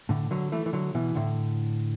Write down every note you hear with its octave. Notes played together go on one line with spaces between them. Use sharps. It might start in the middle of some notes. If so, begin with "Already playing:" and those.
A2 D3
D3 F#3
E3 A3
E3
D3 F#3
B2 E3
A2 D3